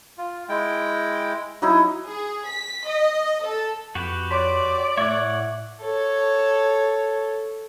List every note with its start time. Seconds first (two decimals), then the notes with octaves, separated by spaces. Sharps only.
0.18 F4
0.49 G#3 E4 G5
1.62 F#3 D#4 E4
2.06 G#4
2.49 B6
2.86 D#5
3.44 A4
3.95 F2 F#4 G4 B4
4.31 C#5 D5 C6 B6
4.98 A2 C#5 E5 F#5
5.81 A4 C#5